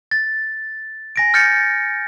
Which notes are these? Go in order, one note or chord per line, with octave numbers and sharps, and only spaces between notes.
A6
G#5 A#6 D7
F6 G6 A6 C#7